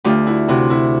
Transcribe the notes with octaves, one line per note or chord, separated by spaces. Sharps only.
D2 F4 G4
E4 F#4
C3 E4 F#4
E4 F#4